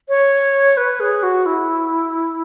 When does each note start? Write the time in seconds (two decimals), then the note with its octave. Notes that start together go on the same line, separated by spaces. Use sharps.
0.09 C#5
0.77 B4
1.00 G#4
1.23 F#4
1.46 E4